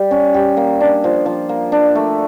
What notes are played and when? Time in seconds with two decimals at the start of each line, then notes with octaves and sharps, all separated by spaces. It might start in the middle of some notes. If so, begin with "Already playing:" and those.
Already playing: G3 G4
0.11 C#4
0.34 G4
0.57 A#3
0.80 D4
1.04 F3
1.26 F3
1.49 A#3
1.72 D4
1.95 A3